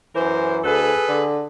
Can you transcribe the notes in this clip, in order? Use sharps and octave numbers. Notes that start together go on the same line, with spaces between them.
F#2 E3 A#4 C5
D2 G#4 A4 B4
D3